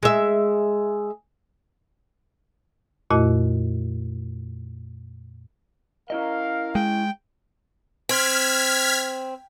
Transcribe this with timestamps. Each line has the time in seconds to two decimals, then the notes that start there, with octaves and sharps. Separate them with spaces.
0.03 G#3 E5
3.10 F2 A#2 A3 E4 F#4 D#5
6.10 C#4 E4 A#4 D#5 F5
6.75 G#3 G5
8.09 C4 F6 G#6 B6